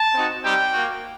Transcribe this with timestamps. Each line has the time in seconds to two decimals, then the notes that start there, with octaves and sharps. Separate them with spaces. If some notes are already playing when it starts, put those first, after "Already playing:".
Already playing: A5
0.14 C4 D#4 F#4
0.44 G3 C4 D#4 G4 G5
0.73 A#3 F#4